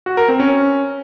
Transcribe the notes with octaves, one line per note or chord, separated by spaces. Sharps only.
F#4
A#4
C4
C#4